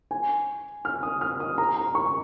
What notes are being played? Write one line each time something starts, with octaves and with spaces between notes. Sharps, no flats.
G#5
F6
D#6
F6
D#6
A#5
A#5
C#6